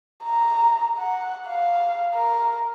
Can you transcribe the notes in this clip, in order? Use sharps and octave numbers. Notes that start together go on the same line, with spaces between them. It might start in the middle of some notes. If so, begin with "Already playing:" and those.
A#5
F#5
F5
A#4